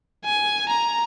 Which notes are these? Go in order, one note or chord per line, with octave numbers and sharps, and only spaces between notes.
G#5
A#5